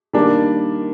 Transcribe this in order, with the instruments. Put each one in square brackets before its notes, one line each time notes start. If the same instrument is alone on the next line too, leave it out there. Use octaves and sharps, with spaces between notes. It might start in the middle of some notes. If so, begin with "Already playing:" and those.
[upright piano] D#3 G3 A#3 D4